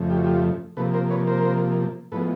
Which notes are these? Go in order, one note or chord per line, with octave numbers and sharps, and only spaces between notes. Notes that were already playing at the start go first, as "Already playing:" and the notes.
Already playing: F2 C#3 F3 A3
G4
F#4
F4 G4
C3 F3 A#3 A4 B4
A#4 C5
B4 C#5
A#4 C5
A2 F3 G#3 B3 A4 B4